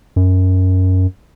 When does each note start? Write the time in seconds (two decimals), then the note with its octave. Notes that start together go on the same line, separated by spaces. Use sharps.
0.16 F#2